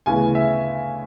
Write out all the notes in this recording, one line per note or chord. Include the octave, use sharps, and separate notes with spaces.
D2 C#3 E3 B3 G#5
E5